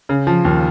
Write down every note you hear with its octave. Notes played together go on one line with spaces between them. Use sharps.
C#3
F3
D#2